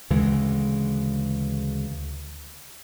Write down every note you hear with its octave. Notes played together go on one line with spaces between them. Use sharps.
D2 C#3 E3 G#3